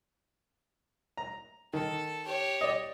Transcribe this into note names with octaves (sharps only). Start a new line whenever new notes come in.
A#5
D#3 A4
G4 C#5
D5 D#5